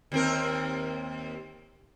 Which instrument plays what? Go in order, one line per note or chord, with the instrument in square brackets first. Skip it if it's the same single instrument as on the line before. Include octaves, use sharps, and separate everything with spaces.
[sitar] D#2 C4 A#4